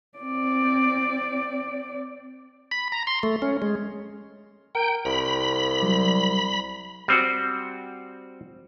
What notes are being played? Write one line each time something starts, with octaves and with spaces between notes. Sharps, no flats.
C4 D5
B5
A#5
C6
A3
C#4
G#3
A#4 G5
C2 B5
F#3 G3 D5
G3 C4 F#4